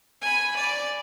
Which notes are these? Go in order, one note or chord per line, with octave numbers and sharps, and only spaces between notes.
G#5 B5
D5